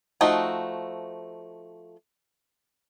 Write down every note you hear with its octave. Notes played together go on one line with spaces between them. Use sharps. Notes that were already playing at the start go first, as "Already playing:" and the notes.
F3 A3 D#4 F#4